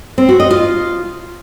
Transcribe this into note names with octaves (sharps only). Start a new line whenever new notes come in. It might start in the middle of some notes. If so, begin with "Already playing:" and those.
C4
F#4
D#5
F4